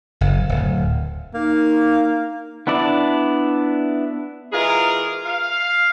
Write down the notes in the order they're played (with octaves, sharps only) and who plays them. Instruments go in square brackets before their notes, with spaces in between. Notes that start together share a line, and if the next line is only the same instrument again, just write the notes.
[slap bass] F#1
D1
[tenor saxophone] A#3 [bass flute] D#4
[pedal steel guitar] B3 D4 E4 D5
[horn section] E3 G#3 F4 G#4 A#4
F5